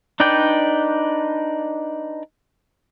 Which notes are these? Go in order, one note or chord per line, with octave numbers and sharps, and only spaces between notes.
D4 D#4 B4 D5 G5